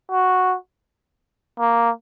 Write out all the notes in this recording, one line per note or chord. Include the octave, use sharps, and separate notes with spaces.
F#4
A#3